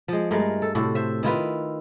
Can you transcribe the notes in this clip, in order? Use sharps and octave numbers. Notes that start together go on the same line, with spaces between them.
F3 G#3
G2 G#3 A3 A#4
A4
A2 C3 F#4 A4
C5 E5
D#3 E4 F4 B4